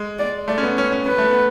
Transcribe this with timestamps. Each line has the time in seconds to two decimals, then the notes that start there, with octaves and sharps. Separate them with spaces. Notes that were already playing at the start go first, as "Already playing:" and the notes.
Already playing: G#3
0.19 D5
0.48 A3 D5
0.58 C#4
0.63 B3
0.77 C#4 C#5
0.92 C#4
1.06 B3 B4
1.18 A3
1.31 B3